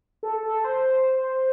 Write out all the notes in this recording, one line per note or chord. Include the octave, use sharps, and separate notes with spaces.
A4
A4
C5